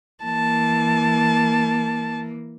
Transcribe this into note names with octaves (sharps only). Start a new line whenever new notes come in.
E3 A#3 A5